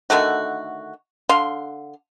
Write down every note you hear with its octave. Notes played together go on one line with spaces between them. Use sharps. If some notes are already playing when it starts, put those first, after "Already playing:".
D3 D#3 A3 F#4
D3 F5 C6